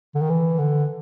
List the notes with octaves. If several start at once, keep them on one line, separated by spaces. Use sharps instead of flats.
D3
D#3
E3
D3